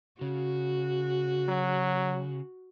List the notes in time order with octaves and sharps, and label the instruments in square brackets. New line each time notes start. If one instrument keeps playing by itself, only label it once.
[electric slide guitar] C#3 [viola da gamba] F#4
[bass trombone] F#3